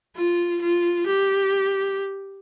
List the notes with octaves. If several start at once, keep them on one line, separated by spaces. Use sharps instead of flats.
F4
F4
G4